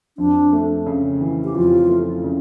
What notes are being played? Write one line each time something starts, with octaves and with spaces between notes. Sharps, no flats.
F2 D4
A3
C#3
E3
G4
F2 F4
A3
C#3